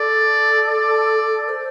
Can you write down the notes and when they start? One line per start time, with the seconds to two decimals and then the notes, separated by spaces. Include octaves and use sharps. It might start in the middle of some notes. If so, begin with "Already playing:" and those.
Already playing: A4 D5
0.68 D5
1.49 C5